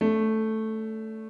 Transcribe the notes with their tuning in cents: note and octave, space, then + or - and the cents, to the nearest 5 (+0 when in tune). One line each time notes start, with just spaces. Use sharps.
A3 +0 D4 -40